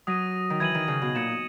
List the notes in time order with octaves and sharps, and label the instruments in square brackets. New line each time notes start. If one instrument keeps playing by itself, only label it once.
[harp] F#3 [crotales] D#6 A#6 D#7
[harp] D#3
[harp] E3 [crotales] G#6 D#7 F#7
[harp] D#3
C#3
B2
[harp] A#2 [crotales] G#6 C#7 E7